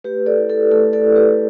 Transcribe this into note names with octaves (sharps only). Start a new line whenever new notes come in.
A3 G4 B4
A4 D5
E4
A4
A3 A4
A4 D5
E4
G4 B4